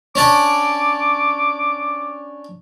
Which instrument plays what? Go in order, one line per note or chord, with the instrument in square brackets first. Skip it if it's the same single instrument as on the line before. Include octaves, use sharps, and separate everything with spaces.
[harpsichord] C#4 D4 D5 [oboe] D6